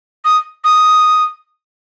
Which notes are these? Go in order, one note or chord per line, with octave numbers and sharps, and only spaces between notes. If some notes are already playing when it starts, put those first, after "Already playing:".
D#6
D#6